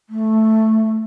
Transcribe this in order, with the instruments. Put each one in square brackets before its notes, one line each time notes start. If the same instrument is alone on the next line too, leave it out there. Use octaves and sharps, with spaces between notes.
[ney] A3